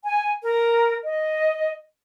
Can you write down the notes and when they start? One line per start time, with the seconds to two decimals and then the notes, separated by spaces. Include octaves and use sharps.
0.03 G#5
0.42 A#4
1.03 D#5